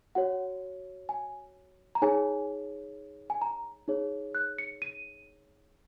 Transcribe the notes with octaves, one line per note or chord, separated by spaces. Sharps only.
F#4 C#5 F#5
G#5
A#5
D#4 G#4 C#5 G#5
G#5
A#5
D#4 G#4 C#5
F#6
C#7
D#7